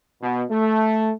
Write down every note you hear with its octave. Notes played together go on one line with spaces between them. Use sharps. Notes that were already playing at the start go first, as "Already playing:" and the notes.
B2
A3